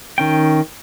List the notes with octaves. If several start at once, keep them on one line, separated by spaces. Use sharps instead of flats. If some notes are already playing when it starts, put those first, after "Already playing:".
D#3 C#4 G5